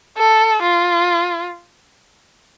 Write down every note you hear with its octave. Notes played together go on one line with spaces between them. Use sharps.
A4
F4